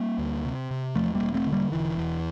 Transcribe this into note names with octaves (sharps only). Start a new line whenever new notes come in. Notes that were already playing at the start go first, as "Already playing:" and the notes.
Already playing: G3 A#3
D2
C3
C3
E2 F3 A3
G3 A#3
E1
A3 C4
D3
G3 A#3
E1 E3
E2